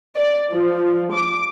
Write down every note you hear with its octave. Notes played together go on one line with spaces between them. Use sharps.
D5
F3
D6